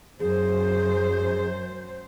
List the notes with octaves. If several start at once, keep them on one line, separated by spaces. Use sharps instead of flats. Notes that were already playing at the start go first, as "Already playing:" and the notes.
F#2 G#4 C5